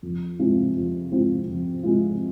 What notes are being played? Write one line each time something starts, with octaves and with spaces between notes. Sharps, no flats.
F2
C3 G#3 C4 F4
F2
C3 G#3 C4 F4
F2
C3 G#3 C4 F4